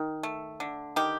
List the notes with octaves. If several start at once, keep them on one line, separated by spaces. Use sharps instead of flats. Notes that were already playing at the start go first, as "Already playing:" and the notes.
Already playing: D#3
A3
D3
D#3 G4